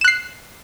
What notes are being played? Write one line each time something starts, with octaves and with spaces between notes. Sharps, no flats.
F#6 C7 E7